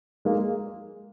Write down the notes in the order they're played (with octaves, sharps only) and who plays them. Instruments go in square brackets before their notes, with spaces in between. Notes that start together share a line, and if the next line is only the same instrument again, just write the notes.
[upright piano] G#3 A#3